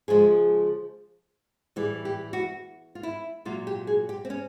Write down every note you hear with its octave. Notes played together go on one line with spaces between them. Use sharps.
C#3 F3 G#3 G#4
A2 E3 G3 G#4
G4
F#4
F4
E4
A#2 F#3 F4
G4
G#4
G4
C4
C#4